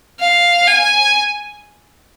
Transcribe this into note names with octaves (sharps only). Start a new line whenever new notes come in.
F5
G#5